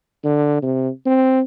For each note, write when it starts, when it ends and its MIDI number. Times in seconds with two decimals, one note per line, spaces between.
0.24 0.61 50
0.62 0.89 48
1.06 1.41 60